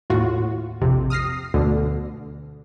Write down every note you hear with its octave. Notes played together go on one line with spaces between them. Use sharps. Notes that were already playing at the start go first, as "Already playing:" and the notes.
D#2 A2 F4 F#4
A#1 F2 C3
D#6 F6 A#6 C7
D2 B2 D3